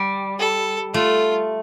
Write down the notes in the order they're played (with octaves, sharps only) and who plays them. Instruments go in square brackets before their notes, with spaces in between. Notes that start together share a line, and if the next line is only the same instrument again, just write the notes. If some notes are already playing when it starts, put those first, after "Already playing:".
Already playing: [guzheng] G3
[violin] A4
[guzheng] A3 [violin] F4